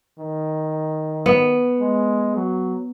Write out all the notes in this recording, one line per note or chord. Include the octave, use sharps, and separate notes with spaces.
D#3
B3
G#3
F#3